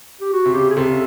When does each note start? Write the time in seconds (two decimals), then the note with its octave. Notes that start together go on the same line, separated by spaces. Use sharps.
0.21 G4
0.33 F#4
0.46 C3
0.54 C#3 G4
0.70 G#4
0.76 C3 A4
0.90 C#3